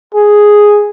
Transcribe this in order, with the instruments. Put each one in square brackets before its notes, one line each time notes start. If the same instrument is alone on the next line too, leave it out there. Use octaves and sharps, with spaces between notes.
[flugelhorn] G#4